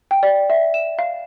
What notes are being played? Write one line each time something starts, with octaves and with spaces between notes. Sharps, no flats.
G5
D5
E5
E7
F5